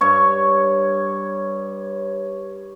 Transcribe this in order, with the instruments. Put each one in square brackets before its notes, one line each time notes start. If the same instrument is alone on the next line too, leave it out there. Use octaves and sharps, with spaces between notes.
[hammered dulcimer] G2 C#5 C#6